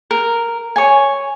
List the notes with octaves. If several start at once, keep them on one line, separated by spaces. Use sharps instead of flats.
A#4
C#5 G#5